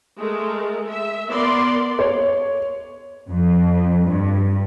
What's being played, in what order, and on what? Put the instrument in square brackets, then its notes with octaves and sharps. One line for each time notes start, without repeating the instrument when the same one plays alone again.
[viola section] G#3 A3 A#4
E5
B3 A#4 D5 C6
[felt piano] C#5
[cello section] F2
G2